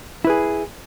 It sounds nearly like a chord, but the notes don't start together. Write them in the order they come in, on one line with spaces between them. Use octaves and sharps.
E4 B4 G#4